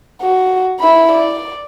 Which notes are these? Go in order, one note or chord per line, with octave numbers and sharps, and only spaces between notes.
F#4
E4 B5
D5